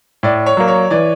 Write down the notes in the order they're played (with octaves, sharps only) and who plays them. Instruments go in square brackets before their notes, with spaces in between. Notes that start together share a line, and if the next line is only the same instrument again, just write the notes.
[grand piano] A2 [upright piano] D5
[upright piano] C#5
[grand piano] F#3 A#3
[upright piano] C#5
[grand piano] E3 [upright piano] D5